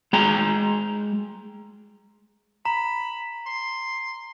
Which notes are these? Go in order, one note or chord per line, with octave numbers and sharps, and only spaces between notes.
G#3 G5 A#5
A#5 B5
C6